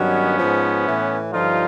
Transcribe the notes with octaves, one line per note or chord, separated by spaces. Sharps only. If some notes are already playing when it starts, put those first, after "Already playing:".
Already playing: G2 D#3 F#3 B3 C#4
G#2 F3
A2 E3
G2 D3 F3 D#4 F4